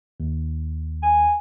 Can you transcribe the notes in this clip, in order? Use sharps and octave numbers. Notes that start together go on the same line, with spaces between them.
D#2
G#5